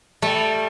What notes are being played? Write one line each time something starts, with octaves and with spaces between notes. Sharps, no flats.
G3 A3